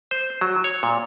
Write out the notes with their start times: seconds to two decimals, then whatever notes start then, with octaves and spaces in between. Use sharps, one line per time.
0.11 C5
0.41 F#3
0.64 C#5
0.83 A#2